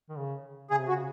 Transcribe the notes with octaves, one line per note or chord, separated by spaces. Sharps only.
D#3
C#3
C#3 G#4
C3
C#3 F#4